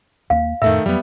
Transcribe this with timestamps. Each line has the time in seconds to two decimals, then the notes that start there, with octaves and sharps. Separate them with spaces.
0.30 D#2 A#3 F5
0.62 F2 A2 D#3 A3 E5 E6
0.86 F2 F#3 G3 B3